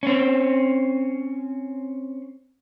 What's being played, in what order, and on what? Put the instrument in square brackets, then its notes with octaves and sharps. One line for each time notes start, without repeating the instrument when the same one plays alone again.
[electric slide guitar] C4 C#4